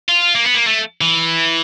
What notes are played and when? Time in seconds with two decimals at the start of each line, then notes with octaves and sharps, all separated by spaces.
0.09 F4
0.35 A#3
0.44 B3
0.55 A#3
0.67 A3
1.01 E3